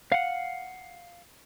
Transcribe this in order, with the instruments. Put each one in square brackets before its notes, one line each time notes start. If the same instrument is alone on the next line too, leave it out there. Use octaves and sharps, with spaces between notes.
[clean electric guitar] F5 F#5